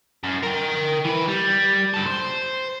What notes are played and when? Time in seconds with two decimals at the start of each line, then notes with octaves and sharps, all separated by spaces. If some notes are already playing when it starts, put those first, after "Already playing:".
0.24 F#2
0.43 A#4 G5
1.05 E3 B4
1.28 G3
1.94 G2 A4
2.06 C5